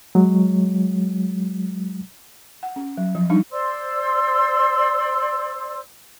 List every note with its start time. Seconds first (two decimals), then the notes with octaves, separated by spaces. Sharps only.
0.15 F#3 G#3
2.63 F#5
2.76 C#4
2.97 F#3
3.15 F3
3.30 G3 D4 D#4
3.50 C5 D5 C6 E6